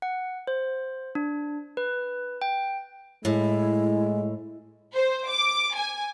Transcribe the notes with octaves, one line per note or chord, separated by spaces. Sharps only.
F#5
C5
D4
B4
G5
A2 G#3 E4
C5
D6
G#5